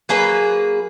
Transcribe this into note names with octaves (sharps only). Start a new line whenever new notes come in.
F#3 A#3 G#4 B4